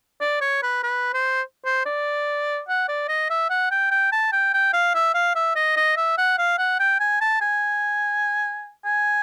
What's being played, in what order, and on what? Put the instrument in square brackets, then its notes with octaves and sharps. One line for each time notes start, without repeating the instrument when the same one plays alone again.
[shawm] D5
C#5
B4
B4
C5
C5
D5
F#5
D5
D#5
E5
F#5
G5
G5
A5
G5
G5
F5
E5
F5
E5
D#5
D#5
E5
F#5
F5
F#5
G5
G#5
A5
G#5
G#5